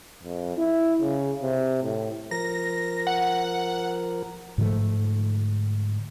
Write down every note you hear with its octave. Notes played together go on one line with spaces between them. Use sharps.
F2
E4
C#3
C3
A2
F3 A#4 A#6
F#5
G#2 D3 F3 A3